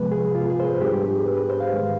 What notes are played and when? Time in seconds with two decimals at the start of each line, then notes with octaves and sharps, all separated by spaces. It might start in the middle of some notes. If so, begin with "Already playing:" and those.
Already playing: C3 F3 G#3 B3 B4
0.12 G#4
0.35 F4
0.50 G#4
0.60 C5
0.65 B4
0.81 G#2 G3 B3 D4 G4
1.03 G#4
1.26 B4
1.37 B4
1.49 C5
1.60 F5
1.72 G#2 D#3 G#3